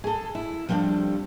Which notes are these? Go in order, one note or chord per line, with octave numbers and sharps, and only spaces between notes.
G#4 A4
E4
F3 G3 C4 D4 A4